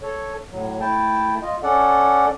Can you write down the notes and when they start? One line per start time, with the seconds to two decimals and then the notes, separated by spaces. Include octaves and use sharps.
0.02 A4 C#5
0.51 A2 F#3
0.81 A3 E4 G5 A5
1.42 F4 D#5
1.63 C#4 A4 D5 F#5